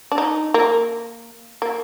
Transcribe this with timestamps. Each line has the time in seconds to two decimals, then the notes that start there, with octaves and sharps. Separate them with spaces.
0.12 D4
0.18 D#4
0.54 A#3
1.62 A#3